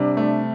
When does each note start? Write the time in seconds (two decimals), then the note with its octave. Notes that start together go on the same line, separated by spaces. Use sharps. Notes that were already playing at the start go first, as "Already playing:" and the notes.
Already playing: C3 G3 D4
0.17 A3